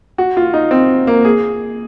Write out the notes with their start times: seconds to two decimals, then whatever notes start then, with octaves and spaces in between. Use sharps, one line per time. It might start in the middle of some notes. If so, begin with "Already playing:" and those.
0.18 F#4
0.37 F4
0.54 D#4
0.71 C4
1.07 A#3
1.25 G#4